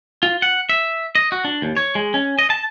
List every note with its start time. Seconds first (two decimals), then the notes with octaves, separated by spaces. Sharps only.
0.23 F4
0.42 F#5
0.69 E5
1.15 D#5
1.32 F#4
1.45 D4
1.62 D#2
1.77 C#5
1.95 G#3
2.14 C#4
2.39 D#5
2.50 A5